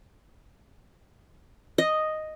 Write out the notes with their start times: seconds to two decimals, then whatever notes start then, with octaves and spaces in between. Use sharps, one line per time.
1.78 D#5